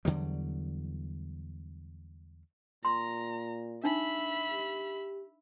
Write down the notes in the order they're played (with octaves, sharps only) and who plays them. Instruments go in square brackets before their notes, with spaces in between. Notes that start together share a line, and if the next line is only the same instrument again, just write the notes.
[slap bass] E2 D3 F#3 G3
[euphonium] A#2 [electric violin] A#5 [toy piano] C6
[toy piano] D4 D#4 [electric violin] E5 B5
[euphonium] G4